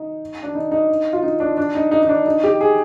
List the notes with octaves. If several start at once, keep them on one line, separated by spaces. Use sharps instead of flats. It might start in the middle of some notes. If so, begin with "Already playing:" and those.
Already playing: D#4
D4
D#4
D#4
F4
D#4
D4
D4
D#4
D#4
D#4
D4
D#4
G4
G#4